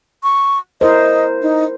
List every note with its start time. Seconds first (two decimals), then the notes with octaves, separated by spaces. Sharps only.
0.23 C#6
0.81 E4 A#4 C5 D#5
1.42 D#4